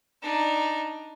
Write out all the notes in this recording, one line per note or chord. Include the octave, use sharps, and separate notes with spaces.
D4 D#4